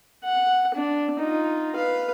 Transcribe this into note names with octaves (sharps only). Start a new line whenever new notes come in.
F#5
D4
D#4 F4
B4 F5